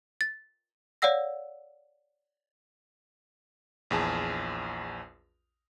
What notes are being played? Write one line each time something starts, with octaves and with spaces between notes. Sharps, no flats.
A6
C#5 D5 F5 F#5 E6 A#6
A#1 E2 G#4 A5